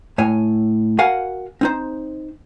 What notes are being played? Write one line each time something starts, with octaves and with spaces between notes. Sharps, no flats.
A2 C#5 G#5
F#4 A#4 F5 F#5 G#5
C4 D#4 C5